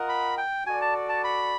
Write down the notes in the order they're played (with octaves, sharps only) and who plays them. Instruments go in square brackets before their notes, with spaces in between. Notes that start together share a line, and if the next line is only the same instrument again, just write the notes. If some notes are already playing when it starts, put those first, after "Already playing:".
Already playing: [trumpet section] F4 A#4 D#5 F#5
[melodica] B5
G5
[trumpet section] F#4 A4 D5 [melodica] G#5
[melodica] A5
A5
B5